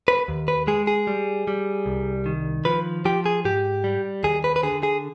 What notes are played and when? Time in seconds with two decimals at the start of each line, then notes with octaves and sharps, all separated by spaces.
0.08 B4
0.28 D#2
0.48 B4
0.67 G#3 G#4
0.87 G#4
1.07 G3
1.48 G3
1.86 C2
2.26 D#3
2.65 F3 B4
3.05 F3 G4
3.26 G#4
3.45 G#2 G4
3.84 G3
4.23 D#2 G#4
4.44 B4
4.56 B4
4.63 D3 G#4
4.83 G#4